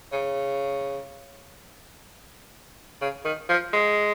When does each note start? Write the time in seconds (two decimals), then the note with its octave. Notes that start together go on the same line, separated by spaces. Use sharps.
0.12 C#3
3.01 C#3
3.24 D#3
3.49 F3
3.73 G#3